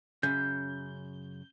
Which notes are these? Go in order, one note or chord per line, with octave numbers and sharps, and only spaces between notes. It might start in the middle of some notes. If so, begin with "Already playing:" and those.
F#2 C#3 G6